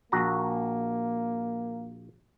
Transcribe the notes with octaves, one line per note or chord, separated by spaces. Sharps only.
A#1 A#3 F#4 A#5